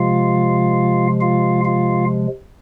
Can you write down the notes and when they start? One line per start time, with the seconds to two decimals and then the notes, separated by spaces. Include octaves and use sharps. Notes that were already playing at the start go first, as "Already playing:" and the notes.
Already playing: C3 F3 G#3 F4 F5
1.21 F4 F5
1.65 F4 F5